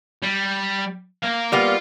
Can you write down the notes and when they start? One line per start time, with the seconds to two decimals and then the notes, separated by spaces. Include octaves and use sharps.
0.23 G3
1.23 A#3 F5
1.52 G3 A#3 B3 F4